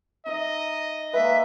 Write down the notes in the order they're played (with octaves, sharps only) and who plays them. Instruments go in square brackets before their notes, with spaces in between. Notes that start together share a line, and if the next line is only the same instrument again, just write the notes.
[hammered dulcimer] D#4 E5 [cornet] D#5
[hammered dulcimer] G#3 A#3 [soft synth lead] B4 [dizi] E5